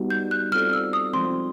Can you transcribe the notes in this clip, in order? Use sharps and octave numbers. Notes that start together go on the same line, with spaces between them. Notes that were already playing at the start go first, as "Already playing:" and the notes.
Already playing: G3 B3 D#4 F#4
G6
F#6
G3 C4 F4 A4 D5 F6
E6
D#6
F3 G#3 C4 C6